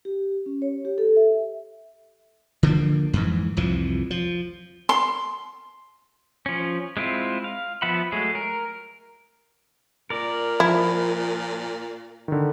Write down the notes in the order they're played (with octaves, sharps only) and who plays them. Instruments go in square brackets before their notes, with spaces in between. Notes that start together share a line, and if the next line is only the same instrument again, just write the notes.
[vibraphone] G4
C#4
C#5
G4
A4
E5
[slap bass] D3 F3 A#3
F2 G#2 E3
C2 F2 E3 F3
F3
[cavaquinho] C6
[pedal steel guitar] F3 C#4
G#3 C4 E4 F4
F5
F3 B3 E5 F#5 B5
F#3 G#3 A3 G#4
A#4
[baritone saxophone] A#2 [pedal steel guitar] A#4 D5
[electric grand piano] F3 [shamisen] E4
[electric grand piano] D3 D#3